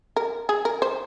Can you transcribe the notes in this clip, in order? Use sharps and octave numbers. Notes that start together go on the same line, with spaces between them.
A#4
G#4
A#4
C5